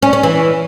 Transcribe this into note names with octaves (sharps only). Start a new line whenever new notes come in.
C#4
C#4
E3